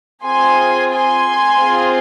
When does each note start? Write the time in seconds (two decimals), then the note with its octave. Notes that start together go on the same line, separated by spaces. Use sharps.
0.24 C4 F4 G#4 G#5 C6
0.90 G#5 C6
1.57 C4 F4 G#4